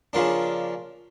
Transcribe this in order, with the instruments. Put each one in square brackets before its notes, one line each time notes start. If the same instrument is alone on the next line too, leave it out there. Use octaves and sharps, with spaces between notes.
[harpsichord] C#3 F3 A#3 D4